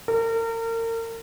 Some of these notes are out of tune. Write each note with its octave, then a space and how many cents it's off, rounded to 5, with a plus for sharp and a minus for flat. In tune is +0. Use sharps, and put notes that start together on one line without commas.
A#4 -35